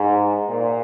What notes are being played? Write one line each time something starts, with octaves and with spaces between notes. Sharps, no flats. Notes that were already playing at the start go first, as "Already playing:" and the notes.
Already playing: G#2
A#2